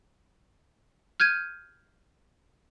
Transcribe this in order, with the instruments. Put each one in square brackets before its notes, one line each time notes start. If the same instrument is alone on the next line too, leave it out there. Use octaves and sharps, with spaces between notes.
[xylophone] F6 G6 G#6 D#7